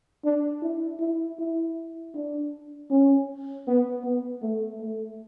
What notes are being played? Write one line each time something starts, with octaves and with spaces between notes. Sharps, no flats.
D4
E4
E4
E4
D4
C#4
B3
B3
A3
A3